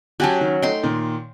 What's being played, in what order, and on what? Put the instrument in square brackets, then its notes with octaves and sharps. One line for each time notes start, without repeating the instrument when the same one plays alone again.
[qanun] F#3 C#4 F#4 [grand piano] G4 G#5 A5
[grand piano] D#3
[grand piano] A3 D#4 [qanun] G5 C6
[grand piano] A#2 D#3